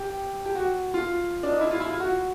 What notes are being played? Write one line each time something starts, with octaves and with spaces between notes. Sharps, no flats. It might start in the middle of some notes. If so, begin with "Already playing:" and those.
Already playing: G4
G4
F#4
F4
D4
D#4
E4
F4
E4
F4
F#4